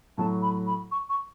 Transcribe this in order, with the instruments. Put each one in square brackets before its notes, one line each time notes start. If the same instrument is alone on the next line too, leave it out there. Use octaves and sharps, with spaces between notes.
[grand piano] A2 F#3 A3 [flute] A5
[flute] B5
B5
C#6
C#6